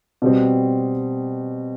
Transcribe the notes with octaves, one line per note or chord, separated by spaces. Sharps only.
B2 G3 C4